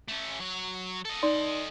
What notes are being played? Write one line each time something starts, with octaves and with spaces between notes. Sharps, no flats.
A3 C#4
F#3 C#5
A4 D#5
D#4 D5 C6